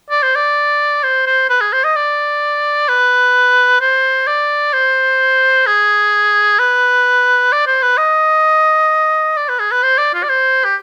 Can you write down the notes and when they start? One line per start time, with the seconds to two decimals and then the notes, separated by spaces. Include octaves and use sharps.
0.10 D5
0.23 C5
0.35 D5
1.03 C5
1.26 C5
1.50 B4
1.61 G#4
1.73 C5
1.84 D#5
1.96 D5
2.88 B4
3.81 C5
4.27 D5
4.73 C5
5.66 G#4
6.59 B4
7.52 D5
7.67 C5
7.82 B4
7.97 D#5
9.37 D5
9.48 B4
9.59 G#4
9.71 B4
9.83 C5
9.98 D5
10.14 F4
10.23 D5
10.29 C5
10.64 G4